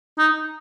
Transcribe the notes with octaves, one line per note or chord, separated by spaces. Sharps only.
D#4